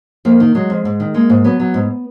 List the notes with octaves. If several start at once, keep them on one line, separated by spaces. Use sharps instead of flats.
F2 A#3
D#3
F#3 G#3
F2
G#2
D#3
G#3 A#3
G#2
F#3 B3
F#3
G#2